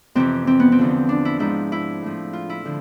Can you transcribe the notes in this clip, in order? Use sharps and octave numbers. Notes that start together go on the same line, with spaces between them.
F2 C3 E3 C4
C4
B3
C4
E2 D3 F3
D4
E4
G#2 F3 E4
E4
A2 F3
F4
E4
D3 F3